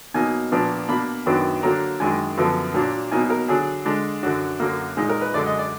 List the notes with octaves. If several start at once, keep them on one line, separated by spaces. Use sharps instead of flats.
B2 F#3 A#3 D#4 G#5
A#2 F3 B3 D4
B2 A#3 D4 B5
F#2 D#3 F#3 B3 D4
D3 F#3 A#3 D4 A#5
F#2 D#3 G#3 D4 G#5
F#2 D3 F3 B3
A#2 F#3 D4
B2 F#3 A#3 D#4 G#5
A#4
D3 F#3 D4 G#4
D3 G#3 D4
F#2 D3 F#3 D4 F#4
F#2 D3 F#3 A#3
A#2 G#3 D#4 G#4
A#4
B4
F#2 D3 G#3 D5
D#5
D5